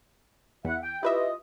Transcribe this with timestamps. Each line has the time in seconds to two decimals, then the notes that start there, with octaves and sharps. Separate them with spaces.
0.65 E2 E4 E5 F#5
0.82 G5
1.03 E4 F4 G4 B4 D#5 E5